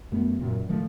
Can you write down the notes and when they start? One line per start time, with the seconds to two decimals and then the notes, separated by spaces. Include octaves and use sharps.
0.12 F#2 A3 B3
0.39 F#2 A#2 C#3
0.69 A2 D#3 F3 A3